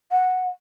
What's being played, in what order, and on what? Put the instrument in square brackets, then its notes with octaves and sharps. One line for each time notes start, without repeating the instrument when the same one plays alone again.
[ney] F#5